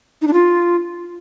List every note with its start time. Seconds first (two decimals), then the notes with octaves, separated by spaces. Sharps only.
0.22 D#4
0.27 D4
0.33 F4